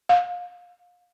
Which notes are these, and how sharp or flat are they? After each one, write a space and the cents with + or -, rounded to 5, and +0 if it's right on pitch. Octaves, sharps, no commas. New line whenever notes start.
F5 +30